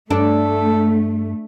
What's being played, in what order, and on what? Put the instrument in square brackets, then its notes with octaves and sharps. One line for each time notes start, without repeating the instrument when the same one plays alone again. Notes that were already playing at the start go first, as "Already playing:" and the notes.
[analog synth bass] G2 [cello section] A3 [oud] D4 [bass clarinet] A4